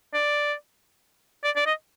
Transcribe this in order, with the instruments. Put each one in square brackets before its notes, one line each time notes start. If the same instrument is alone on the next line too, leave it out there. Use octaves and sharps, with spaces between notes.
[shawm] D5
D5
D5
D#5